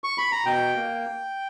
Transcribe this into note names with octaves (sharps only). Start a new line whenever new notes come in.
C#6
B5
A#5
B2 G5
A#3